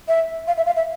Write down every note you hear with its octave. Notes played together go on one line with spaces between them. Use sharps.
E5
F5
E5
F5
E5